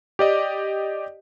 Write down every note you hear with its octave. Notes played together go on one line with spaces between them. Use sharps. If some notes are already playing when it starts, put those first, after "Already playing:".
G4 D5 D#5